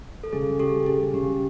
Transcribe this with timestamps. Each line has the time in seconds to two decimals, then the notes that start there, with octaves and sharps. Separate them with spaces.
0.24 A4
0.33 C#3 G#4
0.59 C#3 G4 A4
0.86 C#3 G#4
1.13 C#3 G4